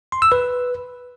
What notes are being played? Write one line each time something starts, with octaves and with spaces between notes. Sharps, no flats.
C6
E6
B4